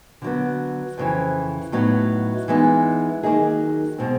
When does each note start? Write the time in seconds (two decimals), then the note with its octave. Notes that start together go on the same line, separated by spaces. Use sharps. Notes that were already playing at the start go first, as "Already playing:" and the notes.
0.22 D3 F#3 B3
0.98 F2 C#3 E3
1.72 A2 F#3 B3 D#4
2.48 E3 G#3 B3 D#4
3.23 D#3 F#3 A#3 D#4 G#4
3.98 B2 G#3 C4